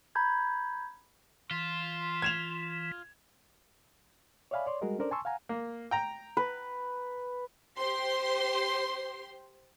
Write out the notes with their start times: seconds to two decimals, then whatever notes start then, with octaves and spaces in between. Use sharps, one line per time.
0.15 A#5 B5 G6 G#6
1.51 E3 F4 C6
2.22 G#6 E7 F7
4.51 C#5 D5 E5 F5 G#5 B5
4.66 C#5 D5 C6
4.81 G3 G#3 F#4 G#4 A#4 D#5
4.99 C#4 D4 A4 A#4 C5 D5
5.11 G#5 A5 C6 C#6 E6
5.25 F5 F#5 G#5 A#5
5.49 A#3
5.91 G5 A#5
6.37 B4
7.77 G4 C5 C6